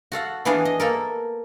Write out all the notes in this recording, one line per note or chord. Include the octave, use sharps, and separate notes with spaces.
F#4 A4 F5 F#5
E3 B3 D4 G#4 F5
D#5
A#3 A4 A#4